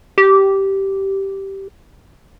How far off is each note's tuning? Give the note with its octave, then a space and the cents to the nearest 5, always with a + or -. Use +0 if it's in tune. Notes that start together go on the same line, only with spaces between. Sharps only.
G4 -10